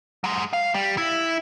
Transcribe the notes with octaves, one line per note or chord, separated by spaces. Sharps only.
F#3 G#3
F5
G3
E4